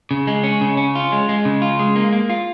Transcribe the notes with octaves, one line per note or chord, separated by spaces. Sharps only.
C#3
G#3
C#4
C#3
C#4
F4
G#3
G#3
C#3
F4
G#3
A#3
A#3
F4